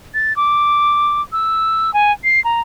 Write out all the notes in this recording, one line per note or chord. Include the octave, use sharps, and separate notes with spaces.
A6
D6
E6
G#5
C7
A#5